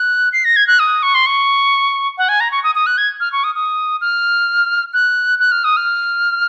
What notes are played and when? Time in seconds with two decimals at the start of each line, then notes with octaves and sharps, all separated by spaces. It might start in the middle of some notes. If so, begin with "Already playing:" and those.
Already playing: F#6
0.33 C7
0.45 A#6
0.56 G#6
0.67 F#6
0.79 D#6
1.03 C#6
1.15 C6
1.26 C#6
2.18 F#5
2.29 G#5
2.40 A#5
2.52 C#6
2.64 D#6
2.75 D#6
2.86 F#6
2.98 G#6
3.20 F6
3.32 C#6
3.44 D#6
3.55 D#6
4.01 F6
4.94 F#6
5.39 F#6
5.52 F6
5.64 D#6
5.77 F6